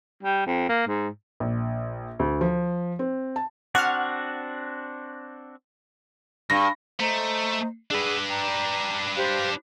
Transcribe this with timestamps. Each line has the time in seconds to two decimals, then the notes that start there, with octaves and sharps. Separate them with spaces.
0.23 G3
0.46 F2
0.69 A#3
0.87 G#2
1.40 A#1
2.19 D2
2.41 F3
2.99 C4
3.36 A5
3.75 C4 D4 F#4 F#5 F6
6.50 G2 A#6
7.00 A3 C5 D#5 A#5
7.91 D4 G#4 B4 F#5 E6
8.28 G5 A#5
9.15 G4 C5 F5